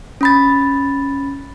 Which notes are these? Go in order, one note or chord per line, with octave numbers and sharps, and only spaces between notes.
C#4 B5 A6